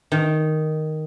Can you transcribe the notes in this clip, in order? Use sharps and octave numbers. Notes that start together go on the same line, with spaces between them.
D#3